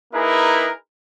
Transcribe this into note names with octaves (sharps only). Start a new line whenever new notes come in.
A#3 D#4 E4 G#4 A#4 B4